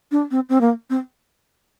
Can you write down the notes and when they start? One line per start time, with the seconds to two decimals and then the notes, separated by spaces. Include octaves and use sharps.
0.11 D4
0.31 C4
0.49 C4
0.61 A#3
0.90 C4